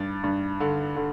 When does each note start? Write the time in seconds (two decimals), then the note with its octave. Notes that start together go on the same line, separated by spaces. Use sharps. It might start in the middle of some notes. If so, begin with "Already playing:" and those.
Already playing: G2 A6
0.24 G2
0.60 D3
0.96 D3